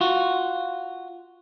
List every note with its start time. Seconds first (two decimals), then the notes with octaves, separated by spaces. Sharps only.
0.01 F4 F#4